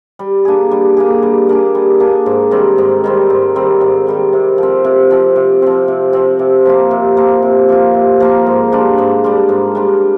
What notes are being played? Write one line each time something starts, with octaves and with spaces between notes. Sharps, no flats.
G3
A#3 D4 G#4
G3
A#3 D4 G#4
G3
A#3 D4 G#4
G3
A#3 D4 G#4
G#2
D#3 G3 C4
G#2
D#3 G3 C4
G#2
D#3 G3 C4
G#2
D#3 G3 C4
C3
F3 C4
C3
F3 C4
C3
F3 C4
C3
F3 C4
C3
F3 A#3 F4
C3
F3 A#3 F4
C3
F3 A#3 F4
C3
F3 A#3 F4
G#2
G3 D4 F4
G#2
G3 D4 F4
G#2
G3 D4 F4